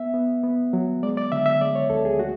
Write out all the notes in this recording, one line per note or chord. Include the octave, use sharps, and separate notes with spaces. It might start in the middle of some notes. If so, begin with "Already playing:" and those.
Already playing: B3 E5
B3
B3
F#3
G#3 D5
D5
D3 E5
E5
G#3 D5
C#5
D2 A4
G#4
A3 F#4